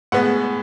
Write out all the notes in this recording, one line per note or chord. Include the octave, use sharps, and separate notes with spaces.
A2 G#3 B3 F#5